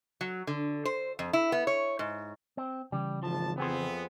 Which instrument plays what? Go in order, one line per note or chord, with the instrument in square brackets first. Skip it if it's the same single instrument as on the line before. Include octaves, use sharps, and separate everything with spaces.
[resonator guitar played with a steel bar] F#3
D3
C5
F2
E4
B3
C#5
G#2
[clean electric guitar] C4
[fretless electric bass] C#3 E3 C#4 [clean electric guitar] G3
[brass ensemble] G#1 D2 A5 [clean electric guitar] F3
[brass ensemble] F2 F3 B3 [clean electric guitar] C4 G#4 C5